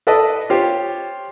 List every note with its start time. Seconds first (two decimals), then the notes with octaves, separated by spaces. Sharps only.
0.07 A4 B4 D5 D#5 A5
0.50 F4 G4 C5 C#5